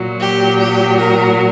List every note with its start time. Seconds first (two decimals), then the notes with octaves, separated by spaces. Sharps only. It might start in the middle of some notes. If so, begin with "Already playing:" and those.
Already playing: A#2 F#3
0.19 G4
0.58 G4
0.97 A#4